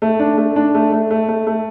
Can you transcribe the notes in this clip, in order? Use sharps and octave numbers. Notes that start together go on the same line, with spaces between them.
A3
D4
A3
D4
A3
A3
A3
A3
A3